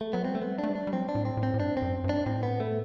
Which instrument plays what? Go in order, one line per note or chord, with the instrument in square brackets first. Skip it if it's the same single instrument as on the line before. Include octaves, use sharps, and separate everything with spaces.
[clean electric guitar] A3
[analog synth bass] F#3 [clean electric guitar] B3
[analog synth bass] G3 [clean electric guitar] C4
[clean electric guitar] A3
B3
[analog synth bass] A3 [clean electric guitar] D4
[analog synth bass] G3
[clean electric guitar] D4
[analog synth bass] G3
[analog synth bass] F#3 [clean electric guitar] C4
[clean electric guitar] D4
[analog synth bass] A2
[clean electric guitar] C4
[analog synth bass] A2
[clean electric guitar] C4
[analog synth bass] A2
[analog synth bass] G2 [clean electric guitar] D4
[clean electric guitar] C4
[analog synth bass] F#2
G2
[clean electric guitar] D4
[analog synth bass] A2 [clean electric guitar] C4
[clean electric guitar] B3
A3